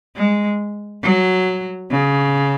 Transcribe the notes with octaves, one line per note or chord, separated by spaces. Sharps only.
G#3
F#3
C#3